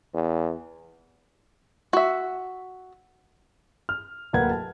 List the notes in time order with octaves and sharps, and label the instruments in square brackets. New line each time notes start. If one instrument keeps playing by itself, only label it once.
[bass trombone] E2
[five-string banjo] F#4 E5
[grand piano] F6
D1 A#3 B4 F#5 G#6
A5